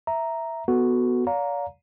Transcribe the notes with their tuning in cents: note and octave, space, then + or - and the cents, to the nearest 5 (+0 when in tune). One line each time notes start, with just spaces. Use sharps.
E5 +0 A#5 +0
B3 +0 F#4 +0 A4 +0
D5 -45 F5 +30 A#5 +0